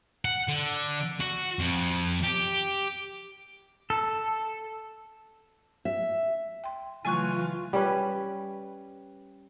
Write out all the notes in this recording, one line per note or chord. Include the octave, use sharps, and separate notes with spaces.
F#5
D3
F#4
F2
G4
A4
E5
G5 C6
C#3 E3 F#3 A3 F4 G#5 C#6 F#6
G3 C#4 B4